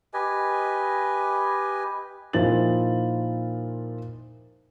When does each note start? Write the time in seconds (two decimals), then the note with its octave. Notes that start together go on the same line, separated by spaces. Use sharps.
0.14 G4 B4 D#5 G#5
2.33 A#2 F3 D#4 E4 A6 F#7